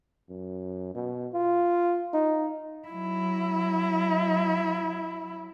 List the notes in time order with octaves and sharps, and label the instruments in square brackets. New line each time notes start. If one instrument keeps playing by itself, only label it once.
[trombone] F#2
B2
F4
D#4
[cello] F#3 E4